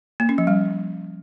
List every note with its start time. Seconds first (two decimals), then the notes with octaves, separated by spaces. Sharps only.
0.20 A#3
0.29 C#4
0.38 F3
0.47 G3